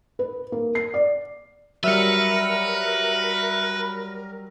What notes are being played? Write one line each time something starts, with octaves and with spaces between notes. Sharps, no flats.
B4
A#3
C7
D5
F#3 G3 A#4 B4 E5 F6 C#7